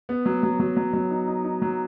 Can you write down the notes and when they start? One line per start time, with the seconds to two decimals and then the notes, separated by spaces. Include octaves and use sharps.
0.09 B3
0.26 F#3
0.43 F#3
0.60 F#3
0.77 F#3
0.93 F#3
1.10 D#4
1.27 D#4
1.44 D#4
1.62 F#3